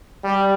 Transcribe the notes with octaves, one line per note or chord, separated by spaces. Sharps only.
G3